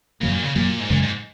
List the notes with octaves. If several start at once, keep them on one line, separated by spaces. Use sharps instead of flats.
F#2 C#3 F#3 A#3
A#2
C#3
F#2 A#2 F#3 A#3
G#2
F#2 A#2 C#3 G#3
G#2